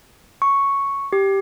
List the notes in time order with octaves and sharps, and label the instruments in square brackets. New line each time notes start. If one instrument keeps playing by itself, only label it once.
[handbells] C#6
G4